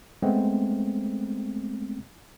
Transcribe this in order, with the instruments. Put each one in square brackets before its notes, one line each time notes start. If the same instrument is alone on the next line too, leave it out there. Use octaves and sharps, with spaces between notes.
[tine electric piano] G#3 A3 B3 C4